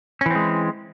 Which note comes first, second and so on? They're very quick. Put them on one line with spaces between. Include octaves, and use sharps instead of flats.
C#4 E3 C4 G#3